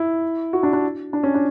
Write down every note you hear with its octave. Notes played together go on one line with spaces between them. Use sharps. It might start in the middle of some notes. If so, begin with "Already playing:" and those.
Already playing: E4
F#4
D4
D4
D4
C#4
D4